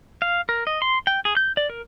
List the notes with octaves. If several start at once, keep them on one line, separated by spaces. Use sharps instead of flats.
F5
A#4
D#5
C6
G5
G#4
G6
D5
A#4